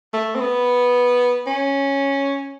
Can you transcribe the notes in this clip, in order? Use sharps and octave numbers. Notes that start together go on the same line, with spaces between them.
A3
C4
B3
C#4